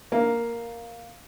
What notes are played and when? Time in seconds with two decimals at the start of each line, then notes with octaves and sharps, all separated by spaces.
0.12 A#3